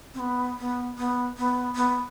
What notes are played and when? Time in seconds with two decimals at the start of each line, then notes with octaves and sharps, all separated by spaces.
0.14 C4
0.19 B3
0.59 B3
0.98 B3
1.38 B3
1.76 B3